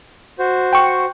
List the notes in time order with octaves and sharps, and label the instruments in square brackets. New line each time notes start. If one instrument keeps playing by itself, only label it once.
[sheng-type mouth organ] F#4 C5
[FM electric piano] G5 C#6